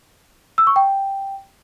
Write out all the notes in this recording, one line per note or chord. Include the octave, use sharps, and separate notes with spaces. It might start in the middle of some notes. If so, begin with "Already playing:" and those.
E6
C#6
G5